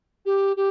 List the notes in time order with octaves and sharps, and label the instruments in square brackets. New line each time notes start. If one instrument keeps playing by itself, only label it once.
[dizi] G4
G4